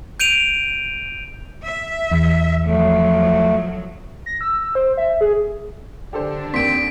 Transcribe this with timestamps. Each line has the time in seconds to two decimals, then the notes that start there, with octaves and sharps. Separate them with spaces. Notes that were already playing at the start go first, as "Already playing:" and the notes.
0.20 G6 D7 D#7 F7
1.65 E5
2.11 E2
2.65 F3 F#3 A3
4.26 A#6
4.41 E6
4.75 C5
4.97 E5
5.21 G#4
6.13 D3 D4 G4 A4 C5
6.54 D#2 A#3 C4 C6 B6 D7